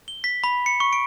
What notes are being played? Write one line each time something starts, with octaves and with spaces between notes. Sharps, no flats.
G7
B6
B5
C#7
C#6
D7